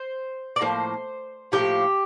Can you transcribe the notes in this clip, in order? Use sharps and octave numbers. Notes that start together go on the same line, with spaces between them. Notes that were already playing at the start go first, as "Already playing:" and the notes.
Already playing: C5
D5
A2 F3 A#3 C5
A2 F3 A#3 G4